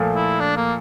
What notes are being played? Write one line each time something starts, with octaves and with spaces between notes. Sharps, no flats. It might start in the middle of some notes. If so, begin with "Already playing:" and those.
Already playing: A#2 F3 A3
E4
D4
A#3